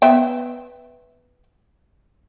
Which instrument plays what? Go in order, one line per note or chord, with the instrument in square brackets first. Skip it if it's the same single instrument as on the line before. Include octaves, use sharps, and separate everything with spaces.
[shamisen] B3 E5 G5